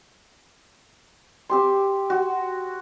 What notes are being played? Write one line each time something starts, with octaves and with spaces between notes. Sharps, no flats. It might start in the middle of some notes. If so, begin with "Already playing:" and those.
C4 G4 C6
F#4